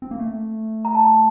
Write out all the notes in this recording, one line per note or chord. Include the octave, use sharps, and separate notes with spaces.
C4
A#3
A3
A#5
A5